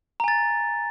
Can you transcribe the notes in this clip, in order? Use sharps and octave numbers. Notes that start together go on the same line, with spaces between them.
G#5 A#5 A6